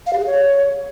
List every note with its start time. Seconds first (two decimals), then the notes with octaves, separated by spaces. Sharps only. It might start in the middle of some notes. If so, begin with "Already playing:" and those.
0.06 F5
0.13 G4
0.20 G#4
0.27 C#5